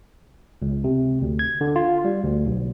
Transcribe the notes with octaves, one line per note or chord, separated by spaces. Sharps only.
C#2
C3
D2
G#6
D3
F4
G3
D2
B1